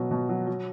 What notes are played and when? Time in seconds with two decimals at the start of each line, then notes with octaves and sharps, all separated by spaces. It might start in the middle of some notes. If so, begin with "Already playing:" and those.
Already playing: B2 F#3
0.11 B2
0.29 F#3
0.47 F#3